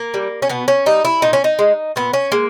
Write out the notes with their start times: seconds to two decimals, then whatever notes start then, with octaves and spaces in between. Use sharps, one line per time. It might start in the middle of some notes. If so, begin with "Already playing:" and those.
Already playing: A#3
0.14 G3
0.42 C#4
0.49 B2 B3
0.68 C#4
0.86 G3 D#4
1.05 E4
1.22 A#2 D#4
1.33 C#4
1.44 D#4
1.59 G#3
1.96 A#2 B3
2.13 C#4
2.32 G#3 A#3